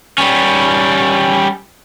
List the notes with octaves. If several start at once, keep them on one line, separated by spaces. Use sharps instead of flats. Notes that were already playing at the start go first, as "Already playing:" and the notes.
G3 C#4